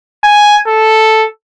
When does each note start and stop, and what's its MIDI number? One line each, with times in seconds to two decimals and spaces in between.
0.24 0.57 80
0.67 1.25 69